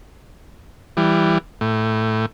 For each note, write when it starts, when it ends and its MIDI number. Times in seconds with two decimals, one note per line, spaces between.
0.97 1.38 52
0.97 1.38 55
1.61 2.26 45